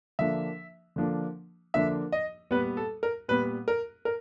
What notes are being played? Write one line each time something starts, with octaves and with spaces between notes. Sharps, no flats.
D3 F3 A#3 D4 E5
D3 F3 A#3 D4
D3 F3 A#3 D4 E5
D#5
A#2 G3 B3 B4
A4
A#4
A#2 G3 B3 B4
A#4
A#4